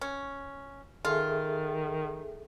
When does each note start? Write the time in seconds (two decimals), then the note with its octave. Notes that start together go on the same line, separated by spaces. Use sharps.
0.01 C#4
1.05 D#3 F4 G#4 A4 E5